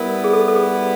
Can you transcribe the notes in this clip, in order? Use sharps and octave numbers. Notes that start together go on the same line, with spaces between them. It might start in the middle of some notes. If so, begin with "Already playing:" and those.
Already playing: G3 B3 E4 A#4
G#4
A4
A4
G#4